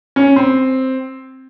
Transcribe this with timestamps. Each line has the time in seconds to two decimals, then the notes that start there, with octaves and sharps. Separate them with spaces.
0.16 C#4
0.36 C4